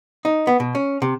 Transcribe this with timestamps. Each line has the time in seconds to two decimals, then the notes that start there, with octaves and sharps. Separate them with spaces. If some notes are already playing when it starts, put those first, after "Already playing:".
0.25 D#4
0.47 B3
0.60 B2
0.75 C#4
1.02 C3